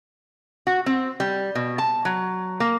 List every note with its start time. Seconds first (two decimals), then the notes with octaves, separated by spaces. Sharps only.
0.67 F#4
0.86 C4
1.20 G3
1.55 B2
1.78 A5
2.05 F#3
2.60 A#3